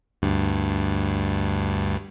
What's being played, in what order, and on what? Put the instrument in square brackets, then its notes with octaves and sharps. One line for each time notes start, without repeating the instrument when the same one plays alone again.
[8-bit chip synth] D2 G2